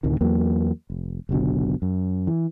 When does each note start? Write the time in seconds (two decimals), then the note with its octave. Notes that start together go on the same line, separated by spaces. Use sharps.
0.03 D2 A2 C3 D#3
0.21 E2 F#3 A#3
0.90 F1
1.29 F#1 B1 B2 D3
1.82 F#2
2.27 E3